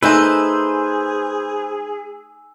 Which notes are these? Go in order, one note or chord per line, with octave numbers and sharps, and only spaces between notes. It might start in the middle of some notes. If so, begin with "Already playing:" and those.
A3 D#4 G#4 B4 C5 G#5 E6